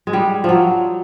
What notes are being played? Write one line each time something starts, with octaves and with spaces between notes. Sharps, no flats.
G#3
G3
F3 F#3